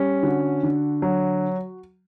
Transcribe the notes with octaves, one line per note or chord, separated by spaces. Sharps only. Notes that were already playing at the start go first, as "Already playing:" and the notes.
Already playing: G3 C#4
D3 F#4
D3
F#3